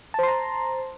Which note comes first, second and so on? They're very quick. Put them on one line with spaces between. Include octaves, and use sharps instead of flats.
A5 C5 C6 A#5